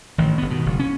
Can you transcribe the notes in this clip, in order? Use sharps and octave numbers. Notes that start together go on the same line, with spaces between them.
A1 D#3
G1 B3
B2 D#3
F#1
C#4